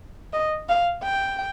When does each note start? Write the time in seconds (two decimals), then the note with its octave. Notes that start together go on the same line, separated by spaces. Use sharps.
0.33 D#5
0.69 F5
1.03 G5